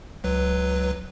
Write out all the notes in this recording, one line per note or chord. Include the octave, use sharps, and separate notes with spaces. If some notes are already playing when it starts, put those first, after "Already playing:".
C#2 F#3 B4